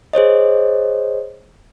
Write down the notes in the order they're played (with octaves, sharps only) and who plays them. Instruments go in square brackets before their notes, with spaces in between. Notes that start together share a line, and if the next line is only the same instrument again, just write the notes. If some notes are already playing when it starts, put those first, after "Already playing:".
[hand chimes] G#4 C5 C#5 D#5